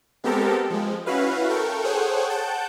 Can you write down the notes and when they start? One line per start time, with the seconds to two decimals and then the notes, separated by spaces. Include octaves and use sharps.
0.24 G#3 B3 C4 G4 A4 A#4
0.70 F3 G#3
1.06 C#4 E4 F#4 B4 F5
1.49 A4 A#4 G5 C#6
1.84 G#4 A4 C5 C#5 F#5 G5
2.29 F#5 G5 A5 G6